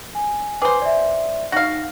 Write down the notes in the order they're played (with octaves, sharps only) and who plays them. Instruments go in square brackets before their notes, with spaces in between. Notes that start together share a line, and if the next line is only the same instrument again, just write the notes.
[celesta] G#5
[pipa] G#4 C5 [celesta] B4 D6
[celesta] D5 E5
[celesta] D#4 A#6 [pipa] F#4 F5